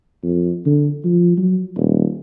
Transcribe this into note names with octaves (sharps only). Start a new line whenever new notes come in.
F2
D3
F3
F#3
D#1